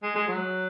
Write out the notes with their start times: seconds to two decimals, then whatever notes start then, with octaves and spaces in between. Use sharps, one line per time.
0.03 G#3
0.15 G#3
0.28 F#3